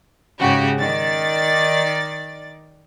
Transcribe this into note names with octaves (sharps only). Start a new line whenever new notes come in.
G#2 C#3 F#4 G4
D#3 D5 A6